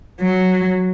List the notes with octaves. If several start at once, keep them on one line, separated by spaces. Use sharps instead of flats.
F#3